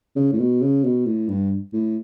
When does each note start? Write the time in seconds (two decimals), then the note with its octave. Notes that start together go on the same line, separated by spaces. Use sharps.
0.16 C#3
0.33 A2
0.39 B2
0.62 C#3
0.84 B2
1.06 A2
1.29 G2
1.74 A2